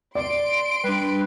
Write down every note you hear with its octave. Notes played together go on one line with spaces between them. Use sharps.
D5 C6 D7
G3 D4 B4